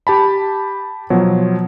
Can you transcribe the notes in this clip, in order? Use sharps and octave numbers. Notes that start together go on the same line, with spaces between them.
G4 A5 B5
B2 F3 F#3